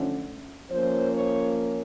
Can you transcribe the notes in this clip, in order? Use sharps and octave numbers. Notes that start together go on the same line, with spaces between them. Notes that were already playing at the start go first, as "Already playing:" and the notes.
Already playing: D3 F3 A3 C#4
F3 A#3 C#4 C5
C#5